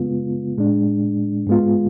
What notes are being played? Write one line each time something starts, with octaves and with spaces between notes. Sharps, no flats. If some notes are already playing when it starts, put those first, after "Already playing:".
Already playing: C#3 G#3 B3 F4
A2 G#3 D4
G#2 G#3 B3 F4